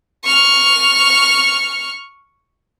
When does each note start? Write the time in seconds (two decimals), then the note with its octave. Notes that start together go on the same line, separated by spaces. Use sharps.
0.24 C#6 F6